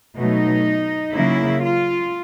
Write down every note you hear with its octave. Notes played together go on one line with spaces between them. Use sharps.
B2 F#3 A3 D#4
C#3 F#3 A#3 E4
F4